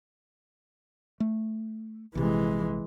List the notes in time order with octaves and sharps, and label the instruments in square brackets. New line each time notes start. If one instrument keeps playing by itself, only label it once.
[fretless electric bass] A3
[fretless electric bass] A#1 C3 [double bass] E3 G#3